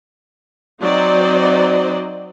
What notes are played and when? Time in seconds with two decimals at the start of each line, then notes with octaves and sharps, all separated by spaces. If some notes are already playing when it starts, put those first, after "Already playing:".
0.81 F#3 C4 D#4 C5 D5 D#5